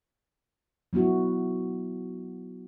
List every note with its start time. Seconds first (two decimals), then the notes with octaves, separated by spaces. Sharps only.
0.93 F#3 B3 E4 F#4